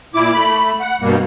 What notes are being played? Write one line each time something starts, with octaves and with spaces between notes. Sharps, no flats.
A#2 E4 D6
A3 B5
F#5
G2 B2 G3 A#3